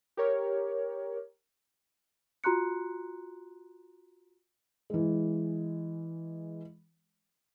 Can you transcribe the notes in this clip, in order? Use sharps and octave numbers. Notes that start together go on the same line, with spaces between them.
G4 A#4 C#5
F4 F#4 A#5 C6 F#6 C#7
E3 G#3